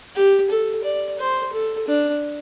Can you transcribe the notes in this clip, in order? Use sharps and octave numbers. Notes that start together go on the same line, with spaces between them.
G4
A4
D5
C5
A4
D4